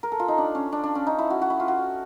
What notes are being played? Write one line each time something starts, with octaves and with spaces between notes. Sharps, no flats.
A#4
A4
F4
D#4
D4
C#4
D4
D4
C#4
D#4
E4
F#4
F#4
E4
F4
F#4